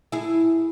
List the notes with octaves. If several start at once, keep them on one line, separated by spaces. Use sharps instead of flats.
E4 G#4